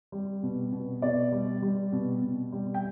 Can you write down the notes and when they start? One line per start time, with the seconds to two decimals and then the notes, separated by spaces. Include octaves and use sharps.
0.12 G3
0.43 B2
0.72 B2
1.02 B2 D5
1.32 G3
1.62 G3
1.92 B2
2.22 B2
2.52 G3
2.74 G5